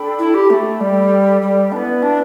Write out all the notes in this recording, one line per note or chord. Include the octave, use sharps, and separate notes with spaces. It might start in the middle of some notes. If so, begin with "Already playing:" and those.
Already playing: D4 A4 G5 B5
E4
G4
A3 A4 G5 B5
G3
G3
B3 D4 E4 B4 D5
D4